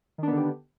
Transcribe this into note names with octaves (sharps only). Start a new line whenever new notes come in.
D3 D#3 B3 D4 G4